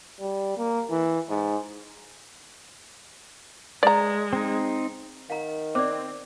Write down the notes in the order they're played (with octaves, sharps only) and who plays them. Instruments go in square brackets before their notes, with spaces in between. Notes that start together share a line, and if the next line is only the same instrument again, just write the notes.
[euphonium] G3
A#3
E3
G#2
[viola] G#3 [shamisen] D5 A#5
[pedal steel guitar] C4 D#4
[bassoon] D#3 [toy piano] F5 F#5 A#5
[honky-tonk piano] C4 [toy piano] C5 D5 [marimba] D6